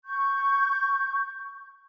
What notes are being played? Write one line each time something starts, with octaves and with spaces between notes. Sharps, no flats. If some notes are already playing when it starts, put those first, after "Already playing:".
C#6 G6